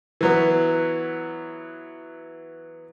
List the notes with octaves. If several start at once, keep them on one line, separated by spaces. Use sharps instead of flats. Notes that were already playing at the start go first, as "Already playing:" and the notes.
E3 F#3 B3